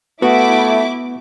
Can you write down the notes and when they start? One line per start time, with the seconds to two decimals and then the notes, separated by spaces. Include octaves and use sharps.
0.22 A3 B3 E4 F#4 D6